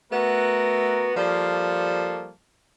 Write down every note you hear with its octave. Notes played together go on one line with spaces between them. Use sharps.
A3 B3 F#4 A#4
F3 G3 A#3 A4